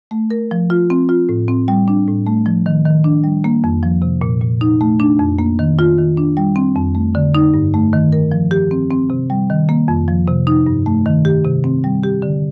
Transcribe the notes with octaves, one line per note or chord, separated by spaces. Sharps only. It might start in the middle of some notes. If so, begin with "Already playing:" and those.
A3
A#4
F3
F4
C4
F4
A2
C4
G3
D4
A2
A3
F3
D#3
D#3
D4
G3
A#3
F2
F3
C3
A#2
A#2
D#4
A3
D4
F2
A#3
D#3
F4
D#3
D4
G3
C4
F2
A3
D3
D#4
G2
A3
D#3
A#4
F3
G4
C4
C4
C3
G3
D#3
A#3
F2
F3
C3
D#4
G2
A3
D#3
G4
C3
C4
G3
G4
D3